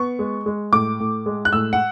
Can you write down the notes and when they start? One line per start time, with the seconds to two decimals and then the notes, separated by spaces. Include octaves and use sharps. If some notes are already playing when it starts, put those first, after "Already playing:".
Already playing: B3 C#6
0.19 G#3
0.46 G#3
0.72 A2 D6
1.00 A2
1.26 G#3
1.45 F#6
1.53 A2 E6
1.73 F#5